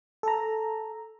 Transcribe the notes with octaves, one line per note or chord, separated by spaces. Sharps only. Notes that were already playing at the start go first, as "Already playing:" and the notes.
A4 A#5